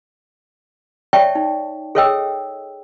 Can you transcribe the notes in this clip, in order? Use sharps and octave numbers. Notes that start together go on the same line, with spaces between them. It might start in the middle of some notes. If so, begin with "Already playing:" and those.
C#5 D5 E5 G5 A5 C#6
D#4
G#4 A4 C#5 D#5 G5 E6